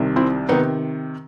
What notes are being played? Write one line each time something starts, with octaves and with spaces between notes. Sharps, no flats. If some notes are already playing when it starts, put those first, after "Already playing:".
Already playing: C2 C3 D#3
C4 E4
C3 D#3 B3 D#4